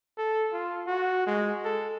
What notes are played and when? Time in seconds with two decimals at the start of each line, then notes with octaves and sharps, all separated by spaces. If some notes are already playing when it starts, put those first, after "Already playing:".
0.18 A4
0.53 F4
0.87 F#4
1.26 G#3
1.64 A4